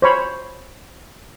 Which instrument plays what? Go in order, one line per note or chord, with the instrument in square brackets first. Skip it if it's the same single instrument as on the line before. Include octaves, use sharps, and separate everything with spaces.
[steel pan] C5 C#5 B5